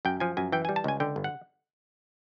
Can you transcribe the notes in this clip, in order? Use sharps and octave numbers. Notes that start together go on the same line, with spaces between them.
F#2 G5
F3 G#5
F#2 G#5
E3 G5
G#5
G3
A5
C#2 G#5
D3 G5
G1
F#5